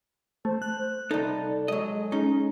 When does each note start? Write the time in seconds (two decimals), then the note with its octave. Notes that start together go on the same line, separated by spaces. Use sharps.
0.45 A3 C5
0.62 F#6
1.11 C2 D#4 A4 D5
1.68 F#3 G#3 D#5
2.12 C#4 D#4